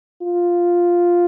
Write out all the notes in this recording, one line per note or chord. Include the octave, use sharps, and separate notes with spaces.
F4